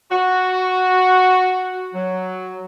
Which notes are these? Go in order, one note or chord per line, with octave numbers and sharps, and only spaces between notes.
F#4
F#3